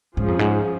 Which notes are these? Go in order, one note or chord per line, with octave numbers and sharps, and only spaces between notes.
G#2 F3 C#4 G#4
F2
G#2